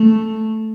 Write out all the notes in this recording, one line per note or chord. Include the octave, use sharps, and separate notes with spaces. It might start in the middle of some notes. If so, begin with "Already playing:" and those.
Already playing: A3